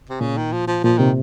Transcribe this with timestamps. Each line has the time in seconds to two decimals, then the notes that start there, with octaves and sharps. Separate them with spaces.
0.10 C3
0.21 A#2 C#3
0.37 D#3
0.52 F3
0.68 F3
0.84 A#2 F3
0.98 C3 D#3